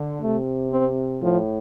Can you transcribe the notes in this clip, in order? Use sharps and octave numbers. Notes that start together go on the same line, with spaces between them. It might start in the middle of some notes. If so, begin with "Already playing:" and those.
Already playing: D3
C3 A3
C4
A2 F3